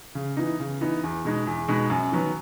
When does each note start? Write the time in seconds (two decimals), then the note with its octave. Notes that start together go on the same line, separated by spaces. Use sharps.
0.15 C#3
0.37 E3 B3 D#4
0.60 C#3
0.81 E3 B3 D#4
1.03 E2
1.25 B2 G#3 D#4
1.47 E2
1.68 B2 G#3 D#4
1.90 F#2
2.12 D#3 F#3 B3